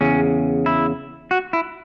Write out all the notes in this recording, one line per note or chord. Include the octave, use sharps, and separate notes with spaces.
E2 C#3 C#4
E4
F#4
E4